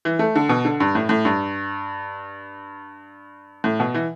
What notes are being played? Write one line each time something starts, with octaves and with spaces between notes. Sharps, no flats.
E3
A3
D3
B2
D3
G2
A2
A2
G2
A2
B2
E3